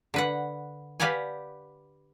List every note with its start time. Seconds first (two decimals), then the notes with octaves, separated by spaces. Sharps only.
0.14 D3 B4 F#5
1.00 G4 B4 D5 F5 F#5 G#5